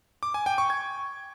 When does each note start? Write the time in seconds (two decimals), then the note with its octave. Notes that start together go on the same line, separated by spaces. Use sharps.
0.23 D6
0.34 G#5
0.46 G5
0.58 C#6
0.70 G#6